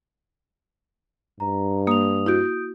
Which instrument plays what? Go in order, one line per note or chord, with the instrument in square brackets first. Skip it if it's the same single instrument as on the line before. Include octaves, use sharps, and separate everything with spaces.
[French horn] G2 [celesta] A#5
[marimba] A#3 [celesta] D#6 F7
[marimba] E4 F#4 [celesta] D#6 G6 D7